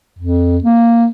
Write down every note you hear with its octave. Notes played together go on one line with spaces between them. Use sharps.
F2
A#3